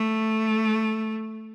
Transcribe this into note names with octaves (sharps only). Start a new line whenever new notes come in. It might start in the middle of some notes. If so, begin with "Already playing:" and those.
Already playing: A3